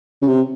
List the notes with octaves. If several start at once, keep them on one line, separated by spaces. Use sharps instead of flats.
C#3
C3